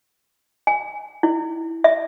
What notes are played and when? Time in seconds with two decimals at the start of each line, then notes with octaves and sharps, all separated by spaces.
0.67 G#5
1.23 E4
1.84 E5